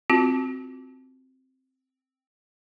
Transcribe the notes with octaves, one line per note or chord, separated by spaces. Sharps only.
C4 F4 F#4